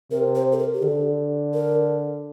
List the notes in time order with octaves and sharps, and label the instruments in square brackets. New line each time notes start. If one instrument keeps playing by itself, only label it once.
[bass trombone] C3 [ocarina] A#4
[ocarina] C5
A4
A#4
G4
[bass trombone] D3 [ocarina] A4
[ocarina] A#4